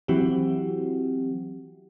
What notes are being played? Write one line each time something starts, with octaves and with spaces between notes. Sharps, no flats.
E3 F#3 C4 E4 F#4 G4